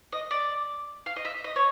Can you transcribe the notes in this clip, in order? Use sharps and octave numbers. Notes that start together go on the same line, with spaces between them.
D#5
D5
F5
D#5
E5
D#5
C#5